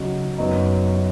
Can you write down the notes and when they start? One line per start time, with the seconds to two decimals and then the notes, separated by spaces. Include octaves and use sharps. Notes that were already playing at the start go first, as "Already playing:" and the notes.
Already playing: C#3 F#3 D#4 F#4
0.38 F#2 F#3 B3 D#4